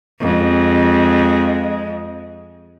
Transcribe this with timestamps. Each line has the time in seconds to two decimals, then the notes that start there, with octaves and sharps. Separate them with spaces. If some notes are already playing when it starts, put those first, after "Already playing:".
0.20 F2 G#3